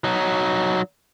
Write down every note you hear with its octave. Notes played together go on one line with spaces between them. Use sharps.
F#3 D#4